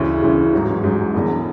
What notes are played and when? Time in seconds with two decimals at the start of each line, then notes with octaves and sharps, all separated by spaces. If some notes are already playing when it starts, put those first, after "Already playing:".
Already playing: D2 C#3 E3
0.22 D2 C#3 E3
0.53 A1 G#2 F#3
0.84 A1 G#2 F#3
1.14 E1 E2 D3